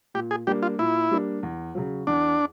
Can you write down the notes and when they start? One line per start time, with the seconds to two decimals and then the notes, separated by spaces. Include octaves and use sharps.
0.14 A#2 G4
0.31 G#4
0.47 G3 A#3 D4 G4
0.63 F4
0.79 A#2 E4
1.11 G3 A#3 D4
1.43 E2
1.75 C#3 F#3
2.07 E2 D4